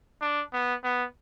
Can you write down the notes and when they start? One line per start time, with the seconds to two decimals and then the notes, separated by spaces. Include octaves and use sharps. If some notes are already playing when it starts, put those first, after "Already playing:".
0.21 D4
0.53 B3
0.83 B3